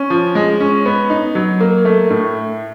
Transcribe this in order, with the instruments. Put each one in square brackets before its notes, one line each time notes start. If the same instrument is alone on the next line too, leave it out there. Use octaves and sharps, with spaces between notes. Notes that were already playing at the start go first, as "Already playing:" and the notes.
Already playing: [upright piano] C#4
F3
G#3
C#4
B3
D#4
F#3
A#3
A3
A2